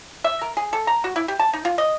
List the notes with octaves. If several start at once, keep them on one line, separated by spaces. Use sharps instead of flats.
E5
A#4
G#4
A4
A#5
F#4
E4
G4
A5
D#4
F4
D#5